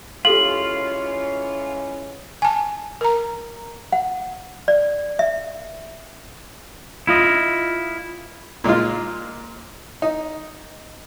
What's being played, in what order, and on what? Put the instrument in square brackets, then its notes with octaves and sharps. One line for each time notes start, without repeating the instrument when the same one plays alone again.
[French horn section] E3 G#3 C#4 [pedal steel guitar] F4 [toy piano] G4 A4 F5 [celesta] F#7
[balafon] G#5 A5
A#4 A#5
[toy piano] F#5
D5
E5
[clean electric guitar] E4 F4 D#5
[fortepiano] A#2 G#3 D#4 F4
D#4